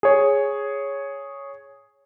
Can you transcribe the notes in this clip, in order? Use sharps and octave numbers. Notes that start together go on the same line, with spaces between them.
G#4 C#5